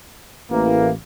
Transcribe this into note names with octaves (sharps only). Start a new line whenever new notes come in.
A1 A2 E3 A#3